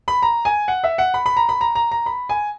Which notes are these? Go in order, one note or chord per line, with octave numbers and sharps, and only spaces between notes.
B5
A#5
G#5
F#5
E5
F#5
B5
B5
A#5
B5
A#5
A#5
A#5
B5
G#5